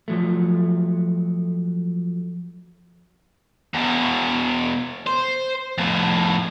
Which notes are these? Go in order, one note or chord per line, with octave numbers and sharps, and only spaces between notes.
F3 F#3 A3
E2 B2
C5
F2 A2